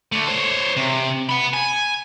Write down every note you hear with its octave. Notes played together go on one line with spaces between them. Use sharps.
D3 A3
C5 C#5
C3
F#5 B5
G#5